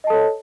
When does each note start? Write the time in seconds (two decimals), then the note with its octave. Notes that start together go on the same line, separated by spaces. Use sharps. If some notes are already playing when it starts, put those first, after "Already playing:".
0.04 D#5
0.07 A5
0.10 A4
0.13 C#5